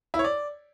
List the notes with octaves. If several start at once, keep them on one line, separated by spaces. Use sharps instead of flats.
E4
C#5
D5